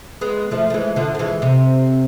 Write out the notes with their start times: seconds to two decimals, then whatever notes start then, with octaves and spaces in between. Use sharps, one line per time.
0.21 G#3 B3
0.51 F3 A3
0.70 A3
0.74 E3 G#3
0.96 D3 F3
1.15 A3
1.19 E3 G#3
1.42 C3